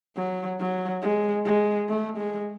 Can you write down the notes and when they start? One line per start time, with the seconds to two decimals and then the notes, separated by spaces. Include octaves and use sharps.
0.16 F#3
0.60 F#3
1.02 G#3
1.46 G#3
1.89 A3
2.18 G#3